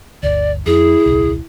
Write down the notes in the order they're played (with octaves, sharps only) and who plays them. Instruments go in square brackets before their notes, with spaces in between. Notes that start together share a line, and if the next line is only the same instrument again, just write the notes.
[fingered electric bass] G1 D2 [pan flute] D5
[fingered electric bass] F2 [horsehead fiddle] E4 [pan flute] G#4
[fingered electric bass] D#1 C2